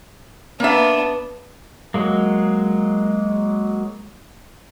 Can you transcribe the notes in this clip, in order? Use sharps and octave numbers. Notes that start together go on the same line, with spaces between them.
A#3 B3 D4 E5
F#3 G#3 A#3